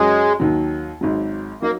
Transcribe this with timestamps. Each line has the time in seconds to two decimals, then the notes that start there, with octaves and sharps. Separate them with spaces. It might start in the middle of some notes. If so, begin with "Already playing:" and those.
Already playing: F#2 F#3 G#3 C#4 F#4
0.40 D#2 D#3 F#3
1.01 G#1 G#2 F#3
1.62 F#3 A#3 D#4